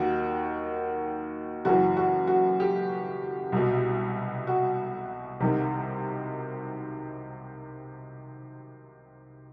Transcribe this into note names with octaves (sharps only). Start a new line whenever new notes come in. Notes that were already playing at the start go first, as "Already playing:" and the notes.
Already playing: D#2 D#3 F#4
F#1 F#2 E3 F#4
F#4
F#4
G4
C2 B2
F#4
C2 C3 D#3